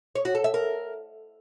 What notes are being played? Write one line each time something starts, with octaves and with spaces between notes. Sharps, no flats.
C#5
F#4
A4
E5
A#4